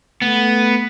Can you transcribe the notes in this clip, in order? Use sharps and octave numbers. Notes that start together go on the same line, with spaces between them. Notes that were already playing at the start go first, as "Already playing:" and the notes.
A3 B3